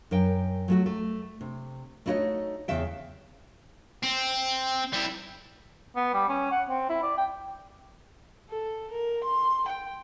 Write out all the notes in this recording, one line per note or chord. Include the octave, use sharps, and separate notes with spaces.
F#2 A#4 G5
F#3 A3 F#4
A3
C3
A3 D#4 E4 F#4 C#5 D#5
E2 C#3 E5 G5
C4
G3 E4
B3
G3
C#4
F#5
C4
E4
D5
G5
A4
A#4
C6
G5